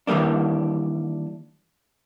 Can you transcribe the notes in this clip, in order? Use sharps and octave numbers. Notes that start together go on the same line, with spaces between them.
D#3 E3 G3 A#3 D4